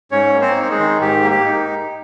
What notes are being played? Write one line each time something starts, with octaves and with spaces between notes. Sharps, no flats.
G#2 C#4 C#5
A#3
C4 C5
D#4
G#3 G#4
D#3
G#2 G4
A#3
G4
D#4